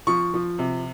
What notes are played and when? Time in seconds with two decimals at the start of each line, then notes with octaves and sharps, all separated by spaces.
0.07 F3 C#6
0.34 F3
0.59 C3